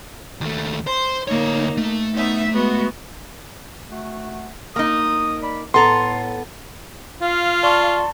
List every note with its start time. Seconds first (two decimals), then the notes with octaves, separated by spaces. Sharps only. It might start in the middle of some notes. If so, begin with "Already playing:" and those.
0.41 D#2 A3
0.87 C5 C6
1.28 D2 A#3 D#4 C#5
1.77 A3
2.13 B3 D#4 E5
2.51 G#3 B3 F#4
3.91 A3 F#4 F#5
4.76 A#3 D#4 D#6
5.42 D5 B5
5.74 A2 B3 A4 A#5 C6
7.21 F4 F5
7.63 D5 A5 C6 C#6